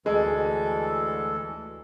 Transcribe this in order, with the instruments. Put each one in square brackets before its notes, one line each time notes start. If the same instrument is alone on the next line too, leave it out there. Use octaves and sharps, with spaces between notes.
[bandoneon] D2 E3 A4 [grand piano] G#3